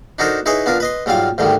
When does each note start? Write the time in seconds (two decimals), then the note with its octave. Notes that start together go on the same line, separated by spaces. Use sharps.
0.19 D4 D#4 F#4 A4 A#4 C5
0.46 D#4 E4 G#4 B4 C#5 D#5
0.66 B3 D4 F4 A#4
0.80 B4 D#5 C6
1.06 G#2 F#3 G3 F4 F5
1.38 D2 G#2 D3 D#3 G3